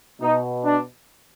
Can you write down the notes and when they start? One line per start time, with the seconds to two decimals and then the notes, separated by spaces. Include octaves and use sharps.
0.21 B2 D#4
0.64 D4